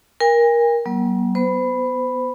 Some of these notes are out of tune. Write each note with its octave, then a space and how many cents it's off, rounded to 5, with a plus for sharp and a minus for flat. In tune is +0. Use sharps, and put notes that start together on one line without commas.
A#4 +15 G#5 -40
F#3 +35 A#3 +45
B3 +0 C5 -35 B5 +0